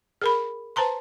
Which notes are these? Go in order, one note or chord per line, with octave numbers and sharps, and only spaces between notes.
G#4 A#4 B5
B4 C5 A5 A#5 C6